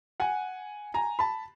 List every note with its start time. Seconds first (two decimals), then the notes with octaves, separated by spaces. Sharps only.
0.20 F#5 G#5
0.94 G#5 A#5
1.19 A5 B5